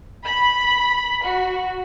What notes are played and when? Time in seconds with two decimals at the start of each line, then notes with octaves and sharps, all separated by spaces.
0.24 B5
1.22 F#4